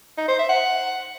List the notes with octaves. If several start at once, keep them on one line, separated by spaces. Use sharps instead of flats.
D#4
C5
E5
F#5